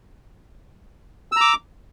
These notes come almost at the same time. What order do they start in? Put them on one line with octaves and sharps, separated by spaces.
E6 A#5 D6